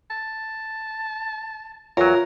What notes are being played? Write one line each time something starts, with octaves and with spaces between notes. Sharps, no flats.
A5
E2 F#3 F4 A#4 C#5